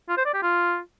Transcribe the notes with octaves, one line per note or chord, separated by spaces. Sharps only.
F4
C5
D5
G4
F4